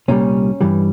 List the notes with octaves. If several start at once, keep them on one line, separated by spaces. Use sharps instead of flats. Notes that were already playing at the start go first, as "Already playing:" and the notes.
C2 A#2 G3 C#4
G2 E3 G3